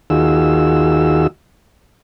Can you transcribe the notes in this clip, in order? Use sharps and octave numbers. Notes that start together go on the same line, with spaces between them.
D#2 D#3 F4 F#4 G#4 E6